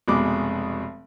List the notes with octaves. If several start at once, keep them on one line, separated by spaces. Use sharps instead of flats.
F1 B2 G#3 B5 D6